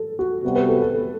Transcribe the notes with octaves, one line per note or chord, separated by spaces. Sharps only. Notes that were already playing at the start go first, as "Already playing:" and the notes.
Already playing: A4
F#4
C3 G3 B3 F#4
B4
A4
A4